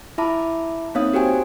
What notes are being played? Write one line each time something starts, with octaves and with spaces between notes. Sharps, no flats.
E4 E5 A5 B5 D6
A#3 C4 D#4 C#5 F5 D#6
F#4 G4 C5 G5 G#5